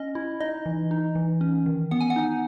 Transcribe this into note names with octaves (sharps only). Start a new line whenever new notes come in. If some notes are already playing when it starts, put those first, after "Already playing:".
Already playing: C#4 D#5
E4
D#4 D#5
E3
D#4
E3
C#4
D#3
B3 F#5
G#5
F#5
D#4